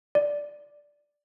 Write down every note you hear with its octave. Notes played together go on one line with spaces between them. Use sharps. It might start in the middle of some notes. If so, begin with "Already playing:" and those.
D5